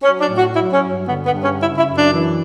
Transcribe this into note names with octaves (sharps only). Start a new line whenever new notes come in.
F#3 C#4
D4
A2
F#4
F#3 E4
C#4
G2
D3 B3
B3
G2
C#4
C#3 E4
E4
F#2
D4
E3